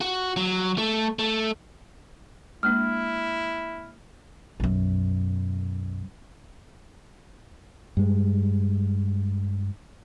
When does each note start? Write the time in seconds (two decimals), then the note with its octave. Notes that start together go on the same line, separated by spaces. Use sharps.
0.01 F#4
0.37 F#3
0.78 A3
1.19 A3
2.63 G#3 A#3 D4 E4 F6
4.60 B1 F#2
7.97 G2 G#3